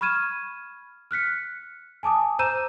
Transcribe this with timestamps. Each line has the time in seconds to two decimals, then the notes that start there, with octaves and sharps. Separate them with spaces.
0.01 B5 C#6 F6 G#6 D#7 E7
1.11 F6 F#6 B6 C#7
2.03 G#5 A5 D6 D#6
2.39 C5 A#5 E6 G6 D#7 E7